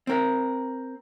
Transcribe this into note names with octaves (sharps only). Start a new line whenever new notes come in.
C4 A#4